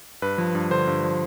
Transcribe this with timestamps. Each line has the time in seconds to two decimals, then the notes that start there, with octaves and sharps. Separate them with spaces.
0.22 G2 B4
0.38 F3
0.55 G2
0.71 D3 C5
0.87 G2
1.04 F3